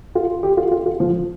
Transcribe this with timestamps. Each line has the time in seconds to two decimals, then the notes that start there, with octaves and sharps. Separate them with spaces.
0.15 F4
0.43 G4
0.57 F4
0.71 F4
0.86 F4
1.00 F3